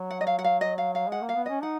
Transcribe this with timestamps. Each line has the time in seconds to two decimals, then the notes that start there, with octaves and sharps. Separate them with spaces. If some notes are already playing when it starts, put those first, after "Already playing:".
Already playing: F#3
0.11 F#5
0.21 D#5
0.27 F5
0.39 F#5
0.44 F5
0.61 D#5
0.78 F5
0.95 F5
1.08 G#3 F#5
1.22 A#3
1.29 F5
1.35 B3
1.46 C#4 D#5
1.62 D#4 F#5